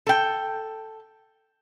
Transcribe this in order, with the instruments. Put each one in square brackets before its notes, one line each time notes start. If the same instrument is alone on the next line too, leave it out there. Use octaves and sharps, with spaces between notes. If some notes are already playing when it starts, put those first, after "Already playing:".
[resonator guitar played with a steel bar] A4 G5